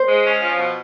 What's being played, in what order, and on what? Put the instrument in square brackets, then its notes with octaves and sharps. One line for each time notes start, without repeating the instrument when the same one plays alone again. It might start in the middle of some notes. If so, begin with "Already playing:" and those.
Already playing: [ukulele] C5
[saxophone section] G#3
C#4
F3
B2